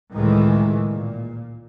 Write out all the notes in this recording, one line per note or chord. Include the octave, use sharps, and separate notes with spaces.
C#2 A2 D#3 E3 G#3
A#2